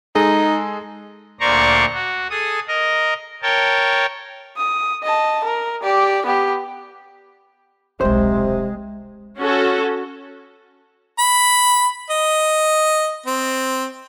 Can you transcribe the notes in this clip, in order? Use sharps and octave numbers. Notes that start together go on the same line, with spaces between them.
G#3 D#4 G#4 A4
D2 A#2 C5 D5 A#5 C#6
F#4
G#4 A4 D#6
A#4 D#5 A#5
A#4 C#5 G5 A5
D#6
D#5 A5
A#4
G4 D5
B3 G4
D#1 B1 C3 G#3 C5
C#4 F#4 A4
B5
D#5
C4